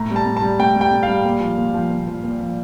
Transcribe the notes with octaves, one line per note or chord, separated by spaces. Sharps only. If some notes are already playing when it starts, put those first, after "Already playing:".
Already playing: A2 A#5
G3
A5
A2
A5
G3
A2 G5
G3
G5
A2
G3 F5
A#2
F3
A#2
F3
A#2
F3
A#2
F3